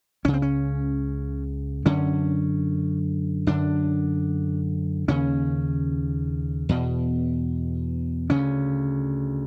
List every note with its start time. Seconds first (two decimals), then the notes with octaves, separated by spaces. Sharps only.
0.25 C#2 C#4
0.28 C#3
0.33 C4
0.42 C#4
1.86 F#2 D3 C#4
3.47 F#2 D3 D4
5.08 D#2 C#3 C#4
6.69 E2 B2
8.30 D2 C#3 C#4